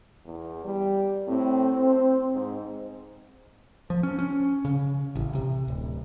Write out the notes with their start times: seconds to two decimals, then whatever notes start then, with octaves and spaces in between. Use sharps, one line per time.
0.25 E2
0.64 G3
1.28 A2 C4
1.78 C5
2.33 G#2
3.90 F3
4.03 C#4
4.19 C#4
4.65 C#3
5.16 A1
5.35 C3
5.68 D1